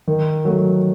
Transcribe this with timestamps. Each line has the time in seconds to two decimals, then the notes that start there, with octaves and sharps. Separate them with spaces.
0.08 D#3
0.45 F#3 A3